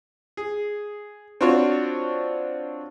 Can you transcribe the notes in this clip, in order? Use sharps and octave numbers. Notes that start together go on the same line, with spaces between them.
G#4
C4 D4 F4 F#4 C5 C#5